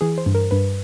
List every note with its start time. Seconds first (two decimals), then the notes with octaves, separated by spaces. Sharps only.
0.01 E3 G#4
0.18 C5
0.26 G2
0.35 A#4
0.51 G2 B4